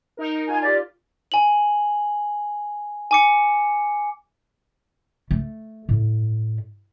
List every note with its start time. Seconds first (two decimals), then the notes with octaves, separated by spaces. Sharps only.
0.17 D#4 A#4
0.49 F4 G#5
0.63 G4 D5
1.32 G#5 F#7
3.11 G#5 D6 C#7
5.31 A3
5.89 A2